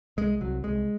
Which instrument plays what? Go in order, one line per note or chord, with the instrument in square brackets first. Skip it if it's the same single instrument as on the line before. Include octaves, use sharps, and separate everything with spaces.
[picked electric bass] C2 G#3
C2 F#3
C2 G#3